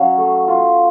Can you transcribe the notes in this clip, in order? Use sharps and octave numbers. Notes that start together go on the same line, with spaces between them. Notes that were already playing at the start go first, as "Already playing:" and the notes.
Already playing: F#3 C#4 F5
A3
F4